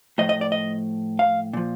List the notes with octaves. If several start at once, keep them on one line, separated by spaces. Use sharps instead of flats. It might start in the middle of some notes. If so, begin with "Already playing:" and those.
A2 F3 D#5
D#5
D5
D#5
F5
A#2 F3